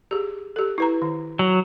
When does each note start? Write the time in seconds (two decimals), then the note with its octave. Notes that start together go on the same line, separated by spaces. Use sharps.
0.11 G4 G#4
0.56 G4 A4
0.78 E4 B4 A#5
1.02 D#3
1.39 F#3